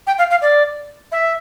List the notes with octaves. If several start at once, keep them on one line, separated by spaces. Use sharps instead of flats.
G5
F5
F5
D5
E5